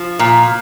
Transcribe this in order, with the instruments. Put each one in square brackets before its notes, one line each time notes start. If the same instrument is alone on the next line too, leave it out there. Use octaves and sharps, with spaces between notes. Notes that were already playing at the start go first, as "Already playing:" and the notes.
Already playing: [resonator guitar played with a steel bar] F3
A#2